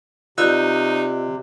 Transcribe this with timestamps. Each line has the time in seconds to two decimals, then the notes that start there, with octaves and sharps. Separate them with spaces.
0.38 C3 D#4 F4 B4 D5 D#5 E6 F#6